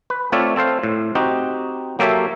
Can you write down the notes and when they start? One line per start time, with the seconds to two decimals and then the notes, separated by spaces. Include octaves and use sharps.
0.10 B4
0.32 A3 C4 F4 C#5 D5 E5
0.56 C4 A4 C5 F5
0.83 A2
1.15 C4 D#4 F#4 G4
1.99 F#3 A#3 G4 A4 C#5 E5